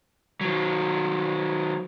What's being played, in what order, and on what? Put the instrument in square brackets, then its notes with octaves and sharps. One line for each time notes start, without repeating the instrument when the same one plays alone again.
[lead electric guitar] D#3 F#3